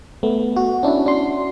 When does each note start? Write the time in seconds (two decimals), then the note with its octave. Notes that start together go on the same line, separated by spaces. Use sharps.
0.23 A3 B3
0.56 F#4
0.83 C#4 D4 E4
1.06 D4 F#4 C6